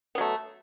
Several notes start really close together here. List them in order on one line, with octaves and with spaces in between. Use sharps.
B3 F#3 A3